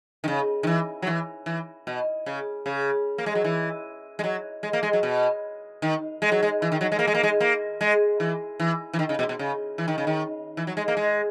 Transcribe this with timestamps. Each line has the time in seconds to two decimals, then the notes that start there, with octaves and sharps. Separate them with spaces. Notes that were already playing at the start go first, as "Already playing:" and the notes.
0.24 D#3
0.28 C#3
0.63 D#3
0.67 E3
1.02 F#3
1.07 E3
1.46 E3
1.87 B2
2.26 C#3
2.66 C#3
3.18 A#3
3.26 G#3
3.35 F#3
3.44 E3
4.19 G#3
4.24 F#3
4.63 G#3
4.73 A#3
4.83 G#3
4.93 F#3
5.03 B2
5.82 D#3
6.22 G#3
6.32 F#3
6.43 G#3
6.62 E3
6.72 D#3
6.81 F#3
6.92 G#3
6.99 A#3
7.07 G#3
7.15 A#3
7.23 G#3
7.40 A#3
7.81 G#3
8.20 E3
8.60 E3
8.93 E3
8.99 D#3
9.09 C#3
9.19 B2
9.29 B2
9.39 C#3
9.78 E3
9.88 D#3
9.98 C#3
10.07 D#3
10.57 E3
10.67 F#3
10.77 G#3
10.88 A#3
10.97 G#3